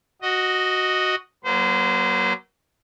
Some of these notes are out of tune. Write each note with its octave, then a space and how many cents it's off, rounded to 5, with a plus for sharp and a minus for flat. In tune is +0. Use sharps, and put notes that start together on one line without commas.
F#4 +0 D#5 +0
F#3 +15 A#3 +30 C5 -35